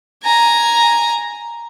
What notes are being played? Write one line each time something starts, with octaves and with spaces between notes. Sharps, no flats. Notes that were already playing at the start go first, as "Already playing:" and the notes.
G#5 A#5